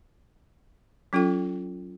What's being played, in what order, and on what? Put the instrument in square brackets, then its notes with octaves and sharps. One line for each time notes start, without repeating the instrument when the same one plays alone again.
[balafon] F#3 C#4 F4 A4 G5